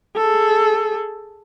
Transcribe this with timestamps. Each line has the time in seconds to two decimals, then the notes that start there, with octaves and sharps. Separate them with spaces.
0.17 G#4 A4